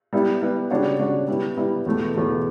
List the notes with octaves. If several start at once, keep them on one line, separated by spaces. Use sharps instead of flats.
G3 B3 E4 B4
G3 B3 E4 B4
C#3 G3 D4 F#4 C#5
C#3 G3 D4 F#4 C#5
G3 B3 E4
G3 B3 E4
E2 B2 A3
E2 B2 A3